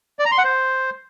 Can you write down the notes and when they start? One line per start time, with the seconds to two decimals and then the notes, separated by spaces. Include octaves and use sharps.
0.19 D5
0.25 A#5
0.32 C6
0.38 F#5
0.44 C5